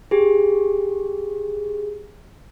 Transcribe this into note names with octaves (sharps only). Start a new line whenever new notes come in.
G4 G#4